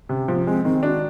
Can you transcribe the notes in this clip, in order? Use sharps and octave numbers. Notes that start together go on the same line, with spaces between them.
C3 C#4
F3 B3
C#4
G#3 C4
D#3 C4
D4 F#4